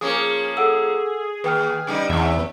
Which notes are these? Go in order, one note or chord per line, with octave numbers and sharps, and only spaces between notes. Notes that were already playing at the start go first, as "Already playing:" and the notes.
F3 A#3 C#4 G#4
A4 F#5 E6
D#2 B4 G5 F6
C#3 G3 D#4
E2 C3 E5